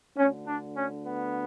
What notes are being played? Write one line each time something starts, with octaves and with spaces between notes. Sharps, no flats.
D2 D3 C#4
D4
C#4
B3